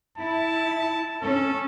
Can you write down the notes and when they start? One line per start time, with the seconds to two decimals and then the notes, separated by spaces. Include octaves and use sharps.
0.18 E4 A5
1.22 C#4 A4